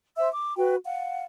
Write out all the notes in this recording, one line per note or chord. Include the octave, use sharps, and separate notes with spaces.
C5 E5 E6
D6
F#4 B4 G5
F5 F#5